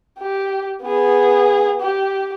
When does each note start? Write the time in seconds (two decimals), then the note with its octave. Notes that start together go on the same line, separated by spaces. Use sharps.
0.19 G4
0.82 B3 G#4
1.80 G4